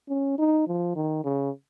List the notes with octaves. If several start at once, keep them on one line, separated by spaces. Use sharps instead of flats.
C#4
D#4
F3
D#3
C#3